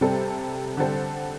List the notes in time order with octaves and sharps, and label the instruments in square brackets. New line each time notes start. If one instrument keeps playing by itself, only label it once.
[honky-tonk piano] C3 G3 C4 A4 C5
D3 G3 C4 A4 C5